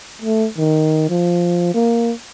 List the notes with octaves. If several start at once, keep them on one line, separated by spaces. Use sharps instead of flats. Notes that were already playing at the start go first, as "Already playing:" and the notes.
A3
D#3
F3
A#3